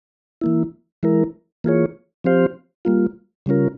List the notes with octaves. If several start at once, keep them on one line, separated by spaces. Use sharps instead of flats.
E3 A#3 E4
E3 G#3 E4 A#4
E3 A#3 F4 G#4 C#5
F3 C4 G4 C5 F5
G3 A#3 F4
C#3 G3 C#4 F4 A#4